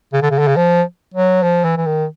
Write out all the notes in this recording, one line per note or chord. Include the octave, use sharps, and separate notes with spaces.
C#3
D3
C#3
D3
C#3
F3
F#3
F3
E3
E3
D#3